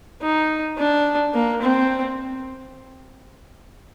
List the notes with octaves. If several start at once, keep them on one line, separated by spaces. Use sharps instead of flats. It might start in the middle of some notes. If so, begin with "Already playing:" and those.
D#4
D4
A#3
C4